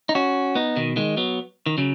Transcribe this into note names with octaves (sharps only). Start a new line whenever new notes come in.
D#4
C#4 F#4
B3 D#4
B2 D#3
D#3 G#3
F#3 B3
D#3
C#3 F#3